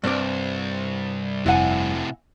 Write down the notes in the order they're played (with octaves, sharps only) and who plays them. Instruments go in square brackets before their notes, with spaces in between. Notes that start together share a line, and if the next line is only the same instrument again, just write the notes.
[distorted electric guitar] C2 [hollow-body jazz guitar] G2 C4 D5
[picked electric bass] F1 [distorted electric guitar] A2 C3 [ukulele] E4 F#5 G#5